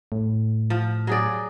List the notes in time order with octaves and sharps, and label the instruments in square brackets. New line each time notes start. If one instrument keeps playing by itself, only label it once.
[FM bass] A2
[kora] F3
F#3 G#4 D5